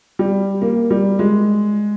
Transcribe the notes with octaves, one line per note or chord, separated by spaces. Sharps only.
G3
A#3
G3
G#3